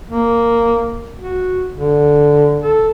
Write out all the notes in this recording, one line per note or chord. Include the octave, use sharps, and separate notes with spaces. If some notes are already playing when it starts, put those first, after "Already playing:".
A#3
F#4
D3
A4